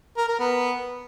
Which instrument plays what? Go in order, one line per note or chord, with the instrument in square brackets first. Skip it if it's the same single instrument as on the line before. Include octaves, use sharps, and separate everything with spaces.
[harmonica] A#4
A#4
B3